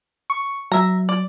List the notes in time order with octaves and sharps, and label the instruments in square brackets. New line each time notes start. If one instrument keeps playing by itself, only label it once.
[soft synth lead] C#6
[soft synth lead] F#3 [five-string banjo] E5 A#5
[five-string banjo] D5